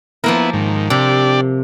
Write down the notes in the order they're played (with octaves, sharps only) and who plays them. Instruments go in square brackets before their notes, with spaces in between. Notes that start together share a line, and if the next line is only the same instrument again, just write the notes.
[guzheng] F3 A#3 A#4 [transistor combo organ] B3 E4
[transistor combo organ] G#2 D#3
[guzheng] C3 [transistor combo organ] D4 G4 D5